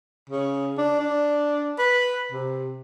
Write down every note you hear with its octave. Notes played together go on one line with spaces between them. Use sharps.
C#3
D4
D4
B4
C3